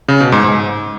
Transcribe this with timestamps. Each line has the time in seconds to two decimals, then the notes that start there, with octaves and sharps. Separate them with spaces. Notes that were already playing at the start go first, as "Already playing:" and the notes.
0.08 C#3
0.20 B2
0.32 G#2
0.44 G#2